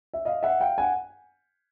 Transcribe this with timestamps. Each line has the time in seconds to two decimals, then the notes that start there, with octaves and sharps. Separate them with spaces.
0.14 E5
0.25 D#5 F5
0.43 E5 F#5
0.60 F5 G5
0.78 F#5 G#5